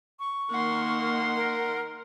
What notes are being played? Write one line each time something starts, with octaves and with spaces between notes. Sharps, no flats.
C#6
D#3 A#3 F#5 C6
A#4